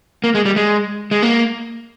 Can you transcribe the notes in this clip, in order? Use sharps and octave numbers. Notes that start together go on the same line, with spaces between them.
A#3
G#3
G3
G#3
G#3
A#3